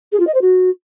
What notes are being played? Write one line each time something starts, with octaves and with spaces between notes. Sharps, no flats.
G#4
F4
D#5
C5
F#4